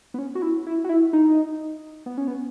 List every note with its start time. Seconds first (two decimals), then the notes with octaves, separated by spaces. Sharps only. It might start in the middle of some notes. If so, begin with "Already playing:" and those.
0.14 B3
0.19 C#4
0.35 F#4
0.42 E4
0.67 E4
0.84 F#4
0.89 E4
1.13 D#4
2.06 B3
2.18 C#4
2.27 B3